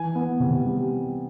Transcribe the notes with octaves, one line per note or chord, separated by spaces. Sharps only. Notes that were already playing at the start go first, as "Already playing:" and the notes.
Already playing: E3 G#5
B3
C3
G3